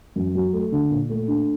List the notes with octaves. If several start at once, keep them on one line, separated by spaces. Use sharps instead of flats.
F#2
F#3
A3
D3
A#2
A3
D4